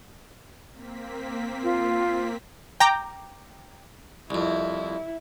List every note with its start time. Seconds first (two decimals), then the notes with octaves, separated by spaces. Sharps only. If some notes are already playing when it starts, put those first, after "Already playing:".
0.72 A#3 C4 B6
1.64 F4
2.80 G5 A#5 D6
4.30 C2 F2 E4